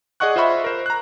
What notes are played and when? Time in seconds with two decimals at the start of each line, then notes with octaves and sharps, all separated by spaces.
0.20 G#4 D5 D#5 F#5 C#6 F#6
0.36 F4 C5 D#5 E5 B5 C#6
0.64 A#4 C5
0.86 A#5 F#6